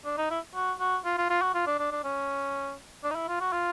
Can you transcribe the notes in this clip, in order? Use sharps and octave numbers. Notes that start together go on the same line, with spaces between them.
D4
D#4
E4
F#4
F#4
F4
F4
F4
F#4
F4
D4
D4
D4
C#4
D4
D#4
E4
F4
F#4
F4